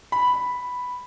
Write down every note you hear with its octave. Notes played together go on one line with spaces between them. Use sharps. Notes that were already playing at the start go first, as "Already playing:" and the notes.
B5